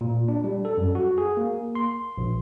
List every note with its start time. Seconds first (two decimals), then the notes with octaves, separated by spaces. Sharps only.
0.01 A#2
0.28 D4
0.44 G3
0.65 A4
0.77 F#2
0.95 F#4
1.18 G#4
1.37 A#3
1.75 C6
2.18 A#1